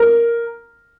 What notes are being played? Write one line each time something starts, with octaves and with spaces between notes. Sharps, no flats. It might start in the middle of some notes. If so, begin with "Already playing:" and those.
Already playing: A#4